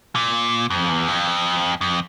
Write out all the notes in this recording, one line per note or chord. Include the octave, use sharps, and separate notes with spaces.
A#2
F2
E2
F2
F2